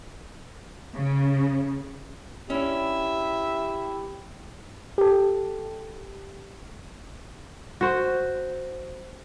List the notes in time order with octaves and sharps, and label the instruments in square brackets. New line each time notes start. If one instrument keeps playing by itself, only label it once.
[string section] C#3
[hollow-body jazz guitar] C#4 D4 [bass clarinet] E4 [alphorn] G4 [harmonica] E5
[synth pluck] G4 A4
[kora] F#4 C5